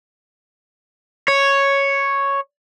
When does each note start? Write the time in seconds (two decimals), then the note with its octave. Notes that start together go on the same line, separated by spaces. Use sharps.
1.28 C#5